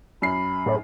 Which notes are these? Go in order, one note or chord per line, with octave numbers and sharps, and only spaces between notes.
F#2 B5 C7
A2